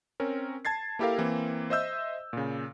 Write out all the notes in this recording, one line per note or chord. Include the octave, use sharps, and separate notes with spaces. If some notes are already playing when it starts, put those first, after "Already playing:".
C4 C#4 A#4
A5 G#6 A6 C7
A#3 E4 G4 A4 A#4 F5
E3 A#3 C4
C5 D#5 E5 E6 G6
A#2 C#3